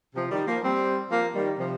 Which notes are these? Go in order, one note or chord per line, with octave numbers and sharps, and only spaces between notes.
C3 F3
D#3 G3
F3 A#3
G3 C4
F3 A#3
D#3 G3
C3 F3